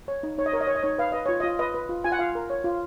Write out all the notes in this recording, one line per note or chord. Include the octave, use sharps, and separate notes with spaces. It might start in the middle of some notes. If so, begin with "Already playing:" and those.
C#5
D#4
D#4 C#5
D#5
A#4 C#5
D#5
C#5
D#5
D#4 C#5
B4 F5
B4 D#5
F4 C#5
F4 D#5
B4 D#5
B4
F4
F4 G#5
F#5
F4 F5
A#4
C#5
F4